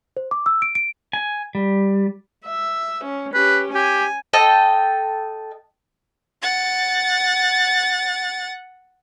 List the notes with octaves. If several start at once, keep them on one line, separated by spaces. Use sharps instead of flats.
C5
D6
E6
D7
D7
G#5
G3
E5
C#4
C#4 G4 B4
G4 G#5
A4 D#5 G5
F#5 A6